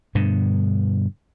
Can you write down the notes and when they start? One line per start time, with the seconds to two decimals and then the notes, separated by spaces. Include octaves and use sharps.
0.15 G2 B2 D3